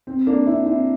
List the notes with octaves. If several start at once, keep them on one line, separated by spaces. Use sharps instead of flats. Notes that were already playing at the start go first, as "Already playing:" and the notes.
C4
A#3 D4
C4 E4
C4 E4